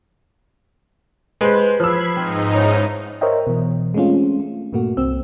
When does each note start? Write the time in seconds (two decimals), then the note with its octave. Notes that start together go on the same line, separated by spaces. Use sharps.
1.41 G#3 G4 B4 C5
1.80 F3 B5 E6 G#6 C7
2.17 G#2 C4 D#4
2.54 C#4 E4
3.21 A#4 C5 C#5 D#5 E5 G5
3.47 B2 E3
3.94 G#3 A3 C4 C#4 F4
4.40 A3
4.73 G2 A#2 A3 A#3 F#4
4.97 C2 C4 E6